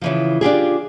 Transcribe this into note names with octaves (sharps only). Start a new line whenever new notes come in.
C#3 E3 F3
D4 F4 G4 G#4